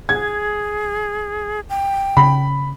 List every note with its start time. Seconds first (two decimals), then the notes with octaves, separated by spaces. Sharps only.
0.09 G#4 G#6
1.70 G5
2.17 C#3 B5